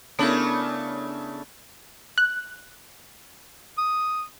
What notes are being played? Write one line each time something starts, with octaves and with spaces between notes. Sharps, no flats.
C#3 A3 B3 D4 E4 A#4
F#6
D#6